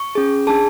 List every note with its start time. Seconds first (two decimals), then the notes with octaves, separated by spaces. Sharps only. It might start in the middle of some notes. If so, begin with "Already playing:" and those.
Already playing: C#6
0.15 C#4 G#4
0.47 D4 G#4 A5